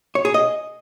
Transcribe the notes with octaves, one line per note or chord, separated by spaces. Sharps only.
C#5
G#4
D#5